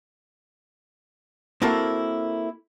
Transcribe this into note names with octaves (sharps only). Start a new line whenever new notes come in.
A#3 C4 E4 F#4 A4 A#4